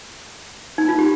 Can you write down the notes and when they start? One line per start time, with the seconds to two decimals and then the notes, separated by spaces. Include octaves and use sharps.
0.78 D#4
0.89 F4
0.99 G4